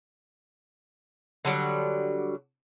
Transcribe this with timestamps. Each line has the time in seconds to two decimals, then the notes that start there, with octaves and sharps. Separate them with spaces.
1.45 D3 F#3 G3